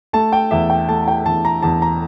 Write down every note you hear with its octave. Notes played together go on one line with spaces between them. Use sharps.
A3 A5
G5
E2 E5
G5
A3 A5
G5
E2 A5
A#5
E2 A5
A#5